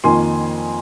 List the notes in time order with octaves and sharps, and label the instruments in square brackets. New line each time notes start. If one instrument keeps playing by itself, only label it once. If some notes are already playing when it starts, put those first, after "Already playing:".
[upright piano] F2 D#3 A#3 G#5 C6